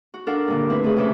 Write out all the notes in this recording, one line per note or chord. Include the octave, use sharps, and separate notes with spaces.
F#4
D4 A4 A#4 F5 F#5
G2 A#2 D3
A3 C4 E4 B4
C#3 A3 G#4 B4
F2 C3 C#4 G4 E5